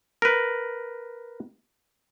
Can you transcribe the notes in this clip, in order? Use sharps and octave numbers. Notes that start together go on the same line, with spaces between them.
A#4 B4